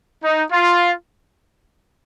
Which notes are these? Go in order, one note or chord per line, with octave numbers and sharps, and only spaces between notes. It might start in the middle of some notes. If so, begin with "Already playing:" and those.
D#4
F4